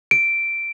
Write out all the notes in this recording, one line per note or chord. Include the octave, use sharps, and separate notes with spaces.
D7